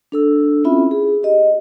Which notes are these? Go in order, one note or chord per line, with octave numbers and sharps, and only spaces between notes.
D4 A4 E6
C4 C#4 E4 F4 E5 B5
G#4
G4 D#5